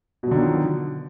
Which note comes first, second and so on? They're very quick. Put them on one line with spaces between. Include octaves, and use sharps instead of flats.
B2 F#3 D3 D#3 F3